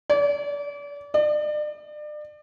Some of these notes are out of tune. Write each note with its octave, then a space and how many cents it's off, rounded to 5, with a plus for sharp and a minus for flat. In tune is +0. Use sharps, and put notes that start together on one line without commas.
D5 -35
D5 +35